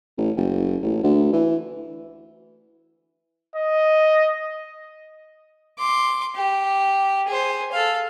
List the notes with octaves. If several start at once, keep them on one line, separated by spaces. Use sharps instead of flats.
A1
F#1
A1
D2
E3
D#5
C6 D6
G4
G#4 C5
A4 F5